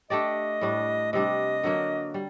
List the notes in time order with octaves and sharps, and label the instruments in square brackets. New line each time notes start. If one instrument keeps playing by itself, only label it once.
[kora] A3 D4 G4 D5 [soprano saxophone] D#5
[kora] A2 G3 D4
[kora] C3 G3 D4 [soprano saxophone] D#5
[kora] D3 F#3 A#3
G3